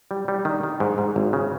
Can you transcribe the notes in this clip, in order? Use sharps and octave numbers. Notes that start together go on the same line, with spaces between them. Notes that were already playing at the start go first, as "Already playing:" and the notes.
G3
G3
D#3
D#3
G#2
G#2
G#1
C#3